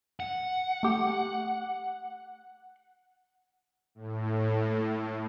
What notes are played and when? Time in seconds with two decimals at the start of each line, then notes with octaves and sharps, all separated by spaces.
0.20 F#5
0.83 A3 G4
3.95 A2